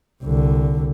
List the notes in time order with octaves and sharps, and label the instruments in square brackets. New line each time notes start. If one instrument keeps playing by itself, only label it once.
[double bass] C2 D3